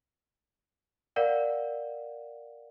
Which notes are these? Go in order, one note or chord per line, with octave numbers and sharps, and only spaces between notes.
A#4 D5 F5 F#5